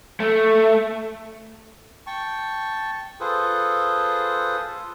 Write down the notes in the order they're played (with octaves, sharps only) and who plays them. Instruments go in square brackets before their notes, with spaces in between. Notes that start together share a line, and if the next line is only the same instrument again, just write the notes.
[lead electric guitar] A3
[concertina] G5 A5 C#6
F4 G#4 A4 B4 C5